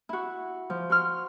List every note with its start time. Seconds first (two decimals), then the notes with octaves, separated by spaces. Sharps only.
0.09 E4 F#4
0.70 F3
0.90 F#4 C6 F6